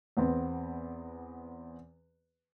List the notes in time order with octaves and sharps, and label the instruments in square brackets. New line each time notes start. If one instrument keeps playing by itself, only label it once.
[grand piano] E2 B3 C4